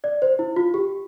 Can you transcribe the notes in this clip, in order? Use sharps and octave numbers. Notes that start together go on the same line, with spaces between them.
D5
C5
E4
F4
G4